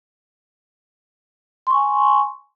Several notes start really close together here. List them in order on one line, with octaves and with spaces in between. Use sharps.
C6 C#6 G#5